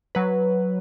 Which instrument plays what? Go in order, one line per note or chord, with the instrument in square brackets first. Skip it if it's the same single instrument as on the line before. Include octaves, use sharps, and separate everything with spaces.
[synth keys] F#3 B4